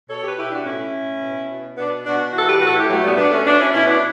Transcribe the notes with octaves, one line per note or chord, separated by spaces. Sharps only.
B2 A4 C#5
G4 B4
B2 E4 G4
D4 F#4
A2 C#4 E4
A2
B2
B2
B2 B3 D4
B2 D4 F#4
E3 F#4 A4
G4 B4
A2 F#4 A4
E4 G4
B2 F#3 A3
G3 B3
B2 B3 D4
A3 C#4
B2 B3 D4
C#4 E4
B2 C#4 E4
B3 D4